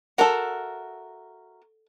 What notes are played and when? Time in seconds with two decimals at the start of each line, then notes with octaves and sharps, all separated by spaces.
0.18 F#4 A4 A#4 E5 F#5